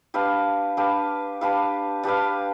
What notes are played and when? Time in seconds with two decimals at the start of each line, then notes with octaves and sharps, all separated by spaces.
0.14 D4 G4 B4 F5
0.77 D4 G4 B4 F5
1.41 D4 G4 B4 F5
2.03 D4 G4 B4 F5